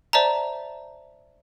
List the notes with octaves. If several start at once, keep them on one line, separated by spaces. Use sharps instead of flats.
C5 D5 E5 A5 A#5